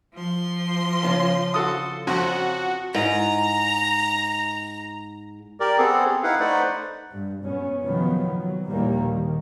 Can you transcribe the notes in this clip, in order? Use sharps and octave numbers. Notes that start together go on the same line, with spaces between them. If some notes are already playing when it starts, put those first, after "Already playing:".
F3 C6
C#3 F4 A5
F#4 A4 D#6
F2 F#4
G#2 A#5
G4 A#4 D5
B3 C4 G#4 A4
G4
D#4 E4 B4 F5 F#5
A3 D#4 B4 C5 D5 F#5
G2
F#2 B3 C#4
C3 D#3 F3 F#3 B3
F#3
A#1 D#2 E3 G3 A#3
D#3